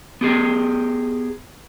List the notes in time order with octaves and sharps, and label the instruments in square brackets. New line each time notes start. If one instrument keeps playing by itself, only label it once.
[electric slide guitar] B3 G4 G#4 D#5